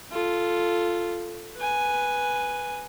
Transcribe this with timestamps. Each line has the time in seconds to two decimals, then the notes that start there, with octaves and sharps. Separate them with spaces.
0.12 F4 A4
1.57 B4 G#5